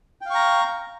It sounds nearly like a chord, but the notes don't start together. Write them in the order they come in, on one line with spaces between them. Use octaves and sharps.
G5 F5 C#6 A#5